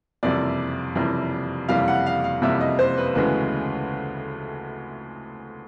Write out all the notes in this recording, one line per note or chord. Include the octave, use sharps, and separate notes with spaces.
F#1 F2 C3 E3 G3 D5
F#1 F2 C3 E3 G3
F#1 F2 C3 E3 G3 F5
F#5
F5
F5
F#1 F2 C3 E3 G3 E5
D#5
C5
B4
D2 C#3 E3 G#3 B3